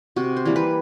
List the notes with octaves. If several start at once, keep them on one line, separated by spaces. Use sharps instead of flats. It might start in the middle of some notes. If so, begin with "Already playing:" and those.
C3 F#4
C5
E3 G3 A#3
B4